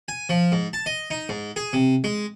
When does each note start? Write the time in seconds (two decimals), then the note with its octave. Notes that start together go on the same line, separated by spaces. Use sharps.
0.08 G#5
0.29 F3
0.52 G#2
0.73 A5
0.86 D#5
1.10 D#4
1.29 G#2
1.56 G#4
1.73 C3
2.04 G#3